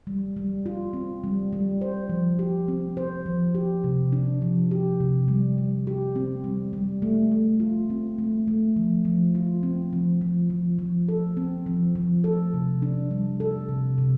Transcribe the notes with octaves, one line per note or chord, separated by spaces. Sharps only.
G3
G3
F4
C4
G3
G3
C5
F3
G4
C4
C5
F3
G4
C3
D4
F3
G4
C3
G3
G3
G4
C4
G3
G3
A3
A3
F4
C4
A3
A3
F3
F3
F4
C4
F3
F3
F3
F3
A4
C4
F3
F3
A4
C3
D4
G3
A4
C3
C3